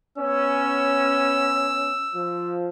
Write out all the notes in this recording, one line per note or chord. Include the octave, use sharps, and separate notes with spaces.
B3 C#4 E6
F3